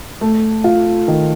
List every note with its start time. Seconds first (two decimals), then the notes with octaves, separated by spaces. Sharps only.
0.21 A3
0.64 F4
1.08 D#3